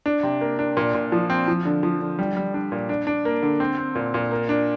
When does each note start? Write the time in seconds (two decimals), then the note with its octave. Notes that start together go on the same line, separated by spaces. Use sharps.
0.06 D4
0.23 C3
0.41 A#3
0.59 D4
0.77 A#2
0.94 A#2
1.12 F3
1.30 C4
1.48 F3
1.65 D3
1.83 F3
2.01 D3
2.19 G3
2.37 G3
2.54 D4
2.72 A#2
2.89 D4
3.07 D4
3.25 A#3
3.43 D3
3.60 C4
3.78 C4
3.95 A#2
4.14 A#2
4.31 A#3
4.49 D4